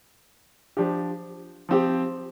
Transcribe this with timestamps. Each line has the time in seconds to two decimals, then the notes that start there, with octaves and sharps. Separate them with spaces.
0.77 F3 D4 G4
1.69 F3 C4 G4